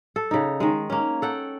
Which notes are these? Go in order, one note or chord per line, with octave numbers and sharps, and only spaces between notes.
A4
C#3 D#4
D#3 G#3
A#3 C#4
A4 F#5 G5